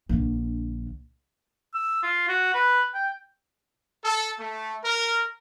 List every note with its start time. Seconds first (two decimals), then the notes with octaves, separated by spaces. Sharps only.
0.09 A#1 D3
1.74 E6
2.03 F4
2.29 F#4
2.54 B4
2.94 G5
4.04 A4
4.39 A3
4.84 A#4